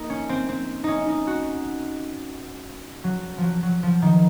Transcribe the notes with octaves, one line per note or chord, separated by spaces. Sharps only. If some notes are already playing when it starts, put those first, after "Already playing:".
Already playing: A#3 D#4
C#4
C4
C4
C#4 D#4
D#4
F#4
F#3
F3
F#3
F#3
F3
D#3